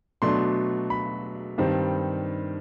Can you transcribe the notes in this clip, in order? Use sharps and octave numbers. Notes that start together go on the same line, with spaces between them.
B2 F#3 A3 D4 C6
B5
G2 D#3 G3 C4